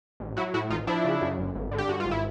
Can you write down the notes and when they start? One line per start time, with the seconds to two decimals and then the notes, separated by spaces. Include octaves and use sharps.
0.20 A1
0.37 F#3 E4 F#4
0.54 A2 E4 F#4
0.70 A1 D#4 F4
0.87 F3 D4 E4
1.05 C#3
1.21 F#2
1.38 G1
1.55 G#1
1.72 D3
1.78 G4
1.89 G2 F#4
2.00 G#1 F4
2.11 E4